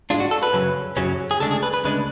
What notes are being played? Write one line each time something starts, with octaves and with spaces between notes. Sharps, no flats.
G#2 G#3 D4 F4
F#4
A4
B4
F#2 C#3 F#3 C#4
F#2 C#3 F#3 C#4
G#4
D2 C#3 G#3 D4 A4
G#4
B4
B4
D2 C#3 G#3 D4 B4